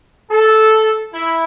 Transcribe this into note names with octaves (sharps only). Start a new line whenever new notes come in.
A4
E4